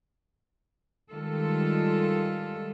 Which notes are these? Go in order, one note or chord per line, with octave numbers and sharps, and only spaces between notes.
D#3 G3 G#3 F4 A4